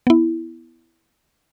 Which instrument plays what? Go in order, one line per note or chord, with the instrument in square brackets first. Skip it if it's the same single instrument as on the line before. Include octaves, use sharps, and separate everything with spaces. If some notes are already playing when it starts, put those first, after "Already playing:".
[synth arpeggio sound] B3 E4